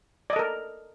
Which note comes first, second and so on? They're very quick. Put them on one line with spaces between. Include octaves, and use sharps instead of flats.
D5 D#5 A4 A#4